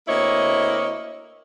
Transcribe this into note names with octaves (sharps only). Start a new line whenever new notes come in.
D2 A#3 C4 E4 C#5 D#5